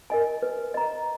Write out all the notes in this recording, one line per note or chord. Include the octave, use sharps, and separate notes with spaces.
A#4 D#5 G#5
B4
D#5 A#5